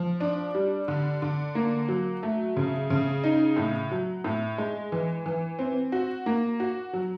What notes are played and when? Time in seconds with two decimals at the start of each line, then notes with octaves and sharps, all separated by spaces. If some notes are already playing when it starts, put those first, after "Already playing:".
Already playing: F3
0.20 D4
0.55 G3
0.88 D3
1.22 D3
1.55 A#3
1.88 F#3
2.23 A3
2.56 C#3
2.90 C#3
3.24 D#4
3.57 A2
3.91 F#3
4.24 A2
4.58 G#3
4.92 E3
5.26 E3
5.59 C4
5.92 F#4
6.26 A#3
6.60 F#4
6.93 F#3